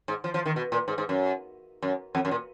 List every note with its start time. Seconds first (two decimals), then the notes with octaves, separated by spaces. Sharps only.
0.08 G#2
0.24 F3
0.34 F3
0.46 D#3
0.56 B2
0.72 A#2
0.88 G#2
0.98 G#2
1.09 F#2
1.82 F#2
2.15 F2
2.25 F#2
2.31 A#2